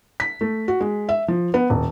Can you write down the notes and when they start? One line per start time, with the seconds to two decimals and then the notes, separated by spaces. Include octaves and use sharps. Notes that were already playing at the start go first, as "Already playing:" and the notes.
0.20 B6
0.41 A3
0.68 F#4
0.81 G#3
1.09 E5
1.28 F3
1.54 B3
1.70 D#1